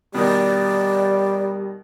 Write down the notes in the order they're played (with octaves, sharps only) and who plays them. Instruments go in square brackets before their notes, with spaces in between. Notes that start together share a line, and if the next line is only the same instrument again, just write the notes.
[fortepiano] B2 D#3 [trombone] G3 [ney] D5